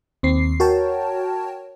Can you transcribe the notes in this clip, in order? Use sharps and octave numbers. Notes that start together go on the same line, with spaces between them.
D#2 C4 C7
F#4 A#4 C#5 G5 A5